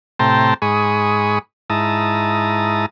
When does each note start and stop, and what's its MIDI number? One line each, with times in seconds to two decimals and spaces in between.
0.20 0.54 45
0.20 0.54 48
0.20 0.54 79
0.20 0.54 81
0.20 0.54 82
0.20 0.54 84
0.62 1.39 44
0.62 1.39 68
0.62 1.39 83
0.62 1.39 85
0.62 1.39 87
1.70 2.86 44
1.70 2.86 64
1.70 2.86 81
1.70 2.86 82
1.70 2.86 87